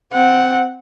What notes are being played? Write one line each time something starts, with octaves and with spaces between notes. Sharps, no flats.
C4 F#5